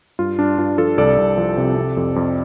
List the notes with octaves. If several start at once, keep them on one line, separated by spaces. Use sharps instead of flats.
G2 F4
G2 D4
G2 F4
F3 F4 A4
C2 A4 D5
C2
F3
C3
C3
F2
F2